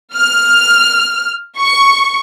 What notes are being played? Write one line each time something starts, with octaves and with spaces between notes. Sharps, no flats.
F6
C#6